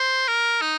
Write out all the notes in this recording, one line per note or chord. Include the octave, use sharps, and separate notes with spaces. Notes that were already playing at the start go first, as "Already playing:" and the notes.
Already playing: C5
A#4
D#4